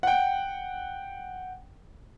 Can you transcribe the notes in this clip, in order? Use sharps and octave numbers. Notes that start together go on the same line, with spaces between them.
F#5 G5